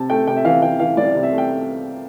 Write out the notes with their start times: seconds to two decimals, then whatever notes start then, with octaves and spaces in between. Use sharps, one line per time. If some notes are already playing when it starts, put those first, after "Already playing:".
Already playing: C3 A5
0.10 A3 G5
0.27 C3 G5
0.36 E5
0.45 E3 F5
0.62 E3 G5
0.79 E3 F5
0.97 C2 D5
1.15 C3
1.23 E5
1.32 A3
1.38 G5